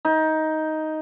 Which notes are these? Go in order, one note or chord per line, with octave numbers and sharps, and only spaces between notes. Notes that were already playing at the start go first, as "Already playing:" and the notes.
D#4